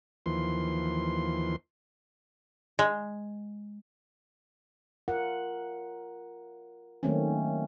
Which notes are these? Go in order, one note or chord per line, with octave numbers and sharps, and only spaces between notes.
D#2 E3 F3 C6
G#3
F4 A#4 F#5
D#3 F#3 A3 A#3 C4 C#4